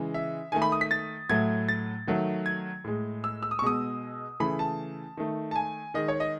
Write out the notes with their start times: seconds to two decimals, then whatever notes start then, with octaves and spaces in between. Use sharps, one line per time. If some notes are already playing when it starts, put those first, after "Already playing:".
Already playing: C#3 E3 G#3
0.14 E5
0.52 D#3 A3 G#5
0.62 B5
0.72 D#6
0.81 B6
0.91 A6
1.29 A2 F#3 A3 G#6
1.69 A6
2.07 D#3 F#3 A3
2.46 G#6
2.84 A2 G#3
3.24 E6
3.43 E6
3.51 D#6
3.59 C#6
3.62 B2 G#3 D#6
4.40 C#3 E3 A3 B5
4.59 A5
5.17 D#3 A3
5.51 A5
5.56 G#5
5.94 D#3 G#3 D#5
6.08 C#5
6.20 D#5